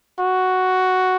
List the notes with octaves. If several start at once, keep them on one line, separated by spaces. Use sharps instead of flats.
F#4